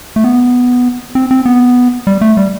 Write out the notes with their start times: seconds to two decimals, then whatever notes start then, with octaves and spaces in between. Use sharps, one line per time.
0.16 A3
0.24 B3
1.15 C4
1.31 C4
1.46 B3
2.07 G3
2.21 A3
2.37 G3